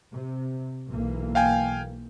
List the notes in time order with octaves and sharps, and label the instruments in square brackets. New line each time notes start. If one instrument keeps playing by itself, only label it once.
[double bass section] C3
B1 E3 A#3
[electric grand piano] F5 G5 G#5